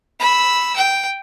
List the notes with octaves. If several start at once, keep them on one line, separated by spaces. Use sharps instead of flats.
B5 E6
G5